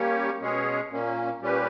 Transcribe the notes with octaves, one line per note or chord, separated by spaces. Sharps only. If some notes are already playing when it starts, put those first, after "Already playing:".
Already playing: G3 A#3 C#4 G4 C#5
B2 G#3 C#4 G#4 C#5
A#2 A#3 C#4
A#2 G3 C#4 G4 B4